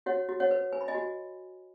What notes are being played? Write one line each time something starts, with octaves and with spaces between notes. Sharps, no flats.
F#4 C#5 F#5
F#4
C#5 F#5
B4
B4 G#5
B5
D#5 G#5
F#4